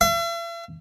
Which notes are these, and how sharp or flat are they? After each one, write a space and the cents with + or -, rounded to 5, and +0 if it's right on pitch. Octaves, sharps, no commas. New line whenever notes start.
E5 +45